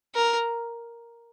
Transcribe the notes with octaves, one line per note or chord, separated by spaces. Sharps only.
A#4